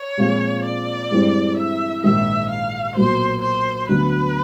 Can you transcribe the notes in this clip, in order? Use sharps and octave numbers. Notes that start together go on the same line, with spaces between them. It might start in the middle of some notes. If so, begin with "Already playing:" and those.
Already playing: C#5
A#2 F3 G#3 C4 F4
D5
G2 E3 G#3 C4
E5
A#1 G#2 D#3 E5
F5
B1 A#2 F#3 A#3 C5
C5
D2 D3 F#3 B3 B4